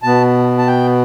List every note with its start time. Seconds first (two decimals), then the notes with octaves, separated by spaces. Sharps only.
0.03 B2 B3 A5
0.58 A5
0.67 G5